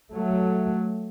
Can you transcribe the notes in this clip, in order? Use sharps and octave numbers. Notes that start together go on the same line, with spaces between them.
F#3 A3